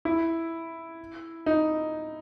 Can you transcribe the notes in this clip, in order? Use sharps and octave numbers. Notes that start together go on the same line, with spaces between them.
E4
D#4